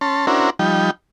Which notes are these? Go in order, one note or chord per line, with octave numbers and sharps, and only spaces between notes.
C#4 A5 C6
C#4 D4 E4 F#4 A#4 C5
F3 G3 D#4 G5